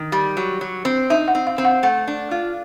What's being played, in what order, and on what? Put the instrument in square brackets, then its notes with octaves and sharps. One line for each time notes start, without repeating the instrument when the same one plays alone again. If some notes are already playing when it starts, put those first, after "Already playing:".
Already playing: [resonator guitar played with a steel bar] D#3
G3
F#3
F#3
C4
[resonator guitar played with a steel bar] D#4 [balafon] E5
[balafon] F#5
[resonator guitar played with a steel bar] C4
[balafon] F5
[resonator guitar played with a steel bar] C4
[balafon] F#5
[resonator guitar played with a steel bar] A3 [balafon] F#5
[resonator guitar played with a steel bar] D4
F4